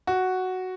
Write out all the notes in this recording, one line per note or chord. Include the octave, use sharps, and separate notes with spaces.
F#4